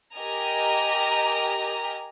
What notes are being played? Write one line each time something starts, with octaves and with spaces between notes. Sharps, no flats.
G4 A#4 D#5 G#5 A#5